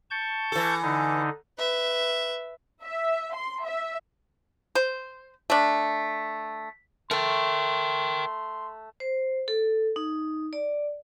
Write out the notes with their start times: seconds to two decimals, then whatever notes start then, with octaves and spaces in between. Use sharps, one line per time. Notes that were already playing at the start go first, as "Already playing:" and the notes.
0.11 A5 C#6 G6
0.52 E3 A4
0.83 D3 D#4
1.58 B4 E5
2.83 E5
3.35 C6
3.65 E5
4.75 C5
5.50 A3 D4
7.11 A3 A#4 G5 C6
9.00 C5
9.48 A4
9.96 D#4
10.53 D5